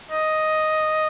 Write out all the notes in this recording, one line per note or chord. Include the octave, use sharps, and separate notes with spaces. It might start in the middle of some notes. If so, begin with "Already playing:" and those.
D#5